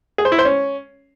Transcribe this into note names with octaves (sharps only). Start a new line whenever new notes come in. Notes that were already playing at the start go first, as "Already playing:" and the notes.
G#4
C5
E4
C5
C#4